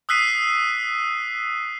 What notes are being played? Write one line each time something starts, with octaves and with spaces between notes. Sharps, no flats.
D#6 E6 F#6 B6 C7 D#7